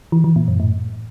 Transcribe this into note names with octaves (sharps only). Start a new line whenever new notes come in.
E3
E3
A#2
F#2
A2